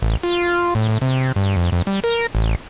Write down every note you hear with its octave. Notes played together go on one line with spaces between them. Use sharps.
A1
F4
A2
A2
C3
G2
F2
F2
G3
A#4
A1